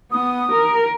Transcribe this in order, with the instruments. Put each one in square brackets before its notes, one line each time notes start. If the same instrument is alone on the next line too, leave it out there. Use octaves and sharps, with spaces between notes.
[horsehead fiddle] B3 [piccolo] D#6
[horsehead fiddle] A#4